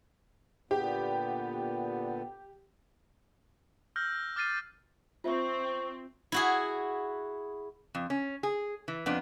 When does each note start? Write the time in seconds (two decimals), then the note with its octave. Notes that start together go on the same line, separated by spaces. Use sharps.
0.71 A#2 D3 B3 G4
3.96 E6 F6 G6 A#6
4.36 D6 F6 A6 C7 D#7
5.24 C4 F4 C5 E5 C#6
6.32 E4 F#4 G#4
7.95 F2
8.10 C#4
8.43 G#4
8.88 E3
9.06 F2 B3 D4